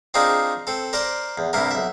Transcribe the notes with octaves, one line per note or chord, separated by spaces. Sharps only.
C4 D4 D#4 F4 G#4 A#4
C4 A4
A#4 C5 D5 A#5 C6
E2
C2 G2 C3 E4 A#4
B1 E5